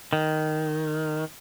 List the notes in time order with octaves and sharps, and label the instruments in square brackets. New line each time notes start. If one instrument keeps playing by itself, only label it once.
[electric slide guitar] D#3